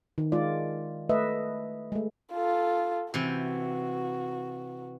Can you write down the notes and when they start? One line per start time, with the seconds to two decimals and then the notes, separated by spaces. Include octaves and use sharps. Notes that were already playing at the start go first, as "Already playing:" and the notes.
0.18 D#3
0.32 G#3 F4 D5
1.09 A3 B4 D#5 E5
1.92 G#3 A3
2.33 F4 A4
3.14 C3 E3 F#4